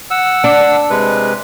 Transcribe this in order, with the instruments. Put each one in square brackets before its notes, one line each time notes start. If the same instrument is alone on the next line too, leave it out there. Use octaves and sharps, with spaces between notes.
[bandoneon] F#5 E6
[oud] D4
[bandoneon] C3 G#3 B4